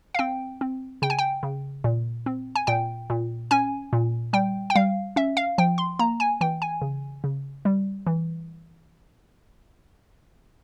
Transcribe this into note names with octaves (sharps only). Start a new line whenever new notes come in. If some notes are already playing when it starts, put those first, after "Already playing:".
F5
C4 G5
C4
C#3 G5
G#5
G5
C#3
A#2
C4
G#5
A#2 G5
A#2
C#4 G#5
A#2
G3 G5
G5
G3 F5
C#4 E5
F5
F3 G5
C6
A#3 A#5
G#5
E3 G5
G#5
C#3
C#3
G3
E3